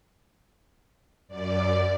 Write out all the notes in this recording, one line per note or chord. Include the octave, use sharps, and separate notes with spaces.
F#2 D5